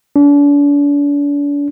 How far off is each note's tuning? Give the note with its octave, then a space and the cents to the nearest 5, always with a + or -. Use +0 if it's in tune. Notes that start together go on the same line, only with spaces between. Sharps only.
D4 -40